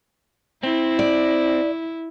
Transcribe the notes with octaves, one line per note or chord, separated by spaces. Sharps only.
C4 E4
D5